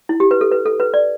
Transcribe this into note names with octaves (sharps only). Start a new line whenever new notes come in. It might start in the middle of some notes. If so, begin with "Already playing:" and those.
E4
G4
B4
A4
B4
A4
B4
D5